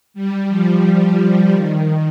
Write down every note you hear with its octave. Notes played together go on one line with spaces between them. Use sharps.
G3
F3
D#3